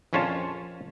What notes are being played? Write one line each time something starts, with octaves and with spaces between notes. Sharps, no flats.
A#1 F2 C#4 F4 C#5 A5